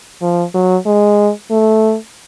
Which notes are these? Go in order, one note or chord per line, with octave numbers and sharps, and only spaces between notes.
F3
F#3
G#3
A3